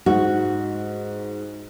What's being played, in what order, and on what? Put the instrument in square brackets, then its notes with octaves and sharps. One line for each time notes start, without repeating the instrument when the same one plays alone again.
[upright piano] G#2 [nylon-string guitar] F#4